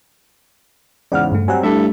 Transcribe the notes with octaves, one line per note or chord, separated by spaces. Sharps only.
E2 G#2 C#3 D5 F#5 F6
G2 A3
F#3 G3 C4 F#5 G#5
G2 A3 E4 A4 E5